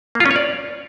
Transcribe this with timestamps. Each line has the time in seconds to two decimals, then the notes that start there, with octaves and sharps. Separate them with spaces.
0.15 A#3
0.20 F4
0.26 C#4
0.31 C#5
0.36 D5